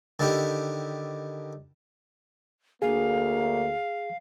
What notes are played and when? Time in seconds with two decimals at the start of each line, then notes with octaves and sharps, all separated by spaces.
0.19 D3 D#3 E4 G4
2.82 D2 A#3 G#4 F5